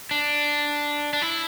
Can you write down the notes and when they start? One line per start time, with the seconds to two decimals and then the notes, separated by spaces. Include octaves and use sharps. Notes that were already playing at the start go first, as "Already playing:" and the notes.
0.11 D4
1.13 D4
1.22 E4